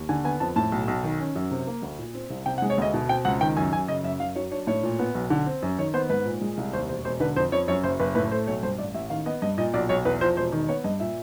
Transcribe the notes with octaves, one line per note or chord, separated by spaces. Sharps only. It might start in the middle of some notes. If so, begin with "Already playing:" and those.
Already playing: D#2
D3 G#5
B3 G#5
F2 A5
A2 A5
B1
B1
D#3
C#4
F#2
C3
A#3
D2
A#2
C4
C2
C3 G5
F#5
G#3
C#5
D2 D#5
B2
C4 G5
C#2 F#5
D#3 G5
F#2 G#5
F#2 G#5
C#3 D#5
F#2 E5
F#2 F5
F#3 C#5
D4 C#5
A2 C#5
A#2
B3
B1
D3
C4
F#2
D#3 C#5
B3 C5
G#2 B4
A#2
G#3
C2
D#2 C5
E1 C5
E1 C5
D3 B4
F2 C5
F2 C#5
F#2 C#5
F#1 C5
F#1 B4
A2 B4
A3 C5
B1 C#5
G2 C5
A1 D5
A1 E5
D#3 F5
B3 D#5
G2 D#5
A#2 D#5
B1 D5
B1 C#5
E2 B4
F3 C5
E1 C5
D#3
B3 C#5
G2 D#5
A#2 E5